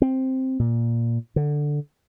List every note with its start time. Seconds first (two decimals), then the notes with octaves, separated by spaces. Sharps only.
0.02 C4
0.59 A#2
1.36 D3